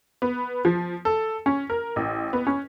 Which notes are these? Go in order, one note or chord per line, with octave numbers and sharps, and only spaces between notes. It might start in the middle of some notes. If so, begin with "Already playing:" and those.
B3
F3
A4
C#4
A#4
A1
B3
C#4